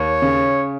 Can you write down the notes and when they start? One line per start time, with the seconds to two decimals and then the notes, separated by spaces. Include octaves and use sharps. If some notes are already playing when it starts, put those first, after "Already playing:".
Already playing: D#2 C#5
0.22 C#3